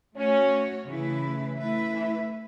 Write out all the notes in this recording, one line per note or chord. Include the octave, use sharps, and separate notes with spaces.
A3 C#4 F#4 C#5
C#3 E3 A3 E4 B4
A3 E4 B4 E5
E3